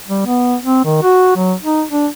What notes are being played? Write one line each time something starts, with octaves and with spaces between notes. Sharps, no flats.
G3
B3
C4
D#3
F#4
F#3
D#4
D4